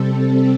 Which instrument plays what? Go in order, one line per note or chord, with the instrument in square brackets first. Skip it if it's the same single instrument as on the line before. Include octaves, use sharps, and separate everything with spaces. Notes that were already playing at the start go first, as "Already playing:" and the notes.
Already playing: [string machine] C3 G3 C4 A4